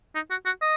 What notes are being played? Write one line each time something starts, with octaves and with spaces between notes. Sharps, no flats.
D#4
F#4
F#4
D#5